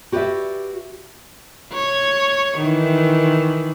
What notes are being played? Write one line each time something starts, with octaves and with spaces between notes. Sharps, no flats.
F#4 G4 B4 C5 D5 E5
C#5
D#3 E3